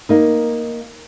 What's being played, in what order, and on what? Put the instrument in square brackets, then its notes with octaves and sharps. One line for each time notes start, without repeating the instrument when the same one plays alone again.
[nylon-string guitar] A#3 D#4